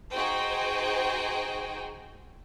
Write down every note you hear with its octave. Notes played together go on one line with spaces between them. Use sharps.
D#4 F#4 G#4 C5 G5